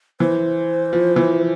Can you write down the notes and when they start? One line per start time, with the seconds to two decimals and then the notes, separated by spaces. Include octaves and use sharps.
0.20 E3 C5
0.93 F3
1.16 E3